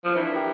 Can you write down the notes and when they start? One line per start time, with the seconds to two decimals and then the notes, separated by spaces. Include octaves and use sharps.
0.05 F3
0.15 E3 D4
0.31 G4 A#4